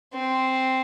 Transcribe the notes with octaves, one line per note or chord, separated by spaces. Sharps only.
C4